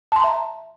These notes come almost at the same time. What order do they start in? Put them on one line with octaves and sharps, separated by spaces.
A5 C6 A#5 E5